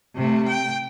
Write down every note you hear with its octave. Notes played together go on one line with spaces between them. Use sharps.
C3 A3
G5